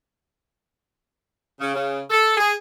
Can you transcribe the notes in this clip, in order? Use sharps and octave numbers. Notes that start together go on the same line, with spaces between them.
C#3
C#3
A4
G#4